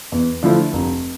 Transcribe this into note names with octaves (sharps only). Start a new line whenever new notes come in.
E2
D3 F3 A3 E4
F1